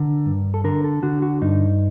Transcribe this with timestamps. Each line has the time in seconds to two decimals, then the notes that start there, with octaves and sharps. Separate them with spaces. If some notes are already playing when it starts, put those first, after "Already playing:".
Already playing: D3 A#4
0.26 G2
0.54 A4
0.64 D3 A#4
0.84 A4
1.03 D3 F#4
1.22 F#4
1.42 G2 D#4